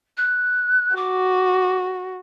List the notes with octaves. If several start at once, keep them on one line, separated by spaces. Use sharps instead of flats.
F#6
F#4 D6